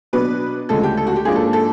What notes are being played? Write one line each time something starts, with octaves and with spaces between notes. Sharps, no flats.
B2 F#3 B3 D4 B4
D2 C#3 F3 G#3 A4
G4
A4
F#4
G4
G#2 F3 A#3 D4 G#4
A4
A4